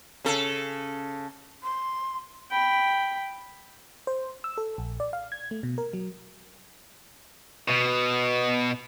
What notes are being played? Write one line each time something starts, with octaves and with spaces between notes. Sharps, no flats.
C#3 A4
C6
G5 B5
C5
E6
A4
A#1
D5
F5
G#6
A3
B2
A#4
F#3
B2